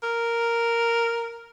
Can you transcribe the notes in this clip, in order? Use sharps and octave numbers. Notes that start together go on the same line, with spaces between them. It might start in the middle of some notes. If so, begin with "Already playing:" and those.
A#4